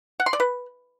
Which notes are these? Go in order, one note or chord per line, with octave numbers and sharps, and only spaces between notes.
F#5
C6
D5
B4